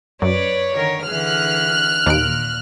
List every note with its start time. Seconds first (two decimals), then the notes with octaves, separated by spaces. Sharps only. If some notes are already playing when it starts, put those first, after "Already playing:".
0.22 F#2 B4 C#5 D5
0.75 D3 D#3 A#4
1.07 D3 E3 G#4 F6 F#6
2.06 D#2 A#2 D7